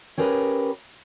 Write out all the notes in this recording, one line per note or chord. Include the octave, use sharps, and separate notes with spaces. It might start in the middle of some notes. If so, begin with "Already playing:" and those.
C#4 G4 G#4 A#4 B4